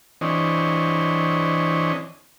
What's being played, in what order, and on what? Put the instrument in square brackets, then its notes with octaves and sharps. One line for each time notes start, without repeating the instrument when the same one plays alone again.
[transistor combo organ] E3 C4 D4 C#5 D#5